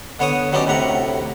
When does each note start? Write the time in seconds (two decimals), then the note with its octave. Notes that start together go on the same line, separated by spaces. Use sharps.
0.20 D3 B3 C#5 F#5 D#6
0.52 F#3 B3 C#4 D#4 G4 D5
0.67 D2 A2 C3 F#5 A#5 B5